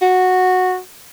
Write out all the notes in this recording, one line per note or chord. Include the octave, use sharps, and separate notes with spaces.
F#4